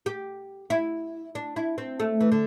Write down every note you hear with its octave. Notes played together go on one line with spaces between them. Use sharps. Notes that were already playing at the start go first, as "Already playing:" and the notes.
G4
E4
D4
E4
C4
A3
E3
D3